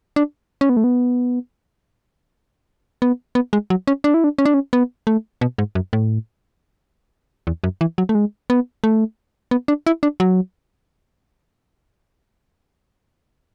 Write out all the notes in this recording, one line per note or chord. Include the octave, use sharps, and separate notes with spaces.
D4
C#4
B3
A3
B3
B3
B3
G#3
F#3
C#4
D4
E4
D4
C#4
D4
C#4
B3
A3
B2
G#2
F#2
A2
E2
F#2
E3
F#3
A3
G#3
B3
A3
B3
D4
E4
D4
F#3